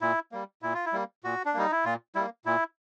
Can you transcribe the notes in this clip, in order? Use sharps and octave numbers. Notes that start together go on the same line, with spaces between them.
A#2 E4
G3 A#3
A#2 E4
F4
E4
G3 A#3
A#2 F#4
D4
G3 A#3 D#4
E4
A#2 F4
G3 A#3 E4
A#2 E4